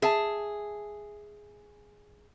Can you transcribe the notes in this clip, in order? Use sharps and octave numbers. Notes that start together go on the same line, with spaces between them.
G#4 E5 A5